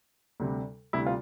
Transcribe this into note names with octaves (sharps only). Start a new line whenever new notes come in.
D2 C3 G3
D2 C3 G3 E4
F4